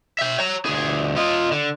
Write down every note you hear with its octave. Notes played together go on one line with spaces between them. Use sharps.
E5 G5
C#5 A#5
D2 G#4
F4 D#5
D3